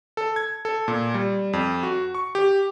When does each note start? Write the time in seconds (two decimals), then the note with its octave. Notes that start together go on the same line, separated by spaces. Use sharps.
0.17 A4
0.36 G#6
0.65 A4
0.88 A#2
1.14 G3
1.53 F2
1.83 F#4
2.15 C#6
2.35 G4